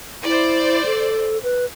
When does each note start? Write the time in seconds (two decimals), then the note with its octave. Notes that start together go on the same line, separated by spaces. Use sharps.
0.24 E4 C5 D5
0.85 A4
1.43 B4